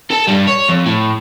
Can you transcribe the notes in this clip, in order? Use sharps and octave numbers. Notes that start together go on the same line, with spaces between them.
A4 A5
G2 G3
C#5
F2
A2